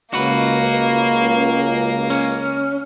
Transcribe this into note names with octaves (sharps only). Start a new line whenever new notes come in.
C#2 A#3 F#4 B4
C#4